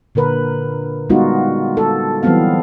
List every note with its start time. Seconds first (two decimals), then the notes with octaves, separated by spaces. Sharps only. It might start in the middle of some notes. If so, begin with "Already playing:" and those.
0.15 A#2 D3 A#4 B4
1.10 G3 G#3 B3 D#4 F4 F#4
1.77 A4
2.23 E3 F#3 G3 B3 C4 F5